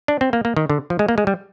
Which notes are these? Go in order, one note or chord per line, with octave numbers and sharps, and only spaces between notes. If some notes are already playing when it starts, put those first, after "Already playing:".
D4
C4
A#3
A#3
D#3
D3
F3
G#3
A#3
G#3
G3